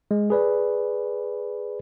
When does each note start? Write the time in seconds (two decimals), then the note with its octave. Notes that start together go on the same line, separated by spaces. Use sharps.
0.11 G#3
0.30 G#4 B4 D5